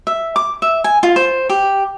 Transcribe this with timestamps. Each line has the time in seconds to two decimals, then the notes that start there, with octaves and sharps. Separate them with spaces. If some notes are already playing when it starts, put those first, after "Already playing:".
0.07 E5
0.36 D6
0.62 E5
0.84 G#5
1.03 F4
1.16 C5
1.49 G4